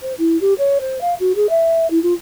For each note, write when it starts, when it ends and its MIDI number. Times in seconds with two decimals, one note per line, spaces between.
0.02 0.12 72
0.18 0.39 64
0.41 0.53 67
0.58 0.78 73
0.80 0.99 72
1.01 1.14 77
1.20 1.32 66
1.35 1.49 68
1.49 1.89 76
1.90 2.01 64
2.03 2.13 65